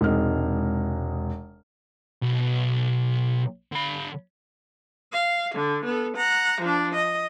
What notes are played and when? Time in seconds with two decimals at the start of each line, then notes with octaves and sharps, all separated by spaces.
0.01 E1 C3 G#3 D#4 F6
2.23 B1
3.72 D3 B5
5.13 F5
5.55 D3
5.85 B3 A4
6.16 F#5 A#5
6.61 F3 D4
6.94 D#5